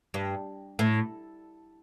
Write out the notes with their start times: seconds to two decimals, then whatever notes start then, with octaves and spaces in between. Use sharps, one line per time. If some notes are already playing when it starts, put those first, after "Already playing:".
0.14 G2
0.79 A2